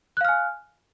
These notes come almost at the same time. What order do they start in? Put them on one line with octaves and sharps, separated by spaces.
F#6 F5 F6 G#5